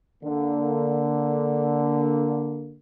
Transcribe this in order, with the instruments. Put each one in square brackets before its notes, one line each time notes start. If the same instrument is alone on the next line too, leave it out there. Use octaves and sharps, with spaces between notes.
[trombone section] D3 A#3